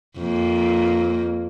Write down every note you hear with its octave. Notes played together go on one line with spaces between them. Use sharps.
F2 A#3